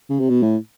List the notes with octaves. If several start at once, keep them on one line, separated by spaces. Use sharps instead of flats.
C#3
C3
B2
A2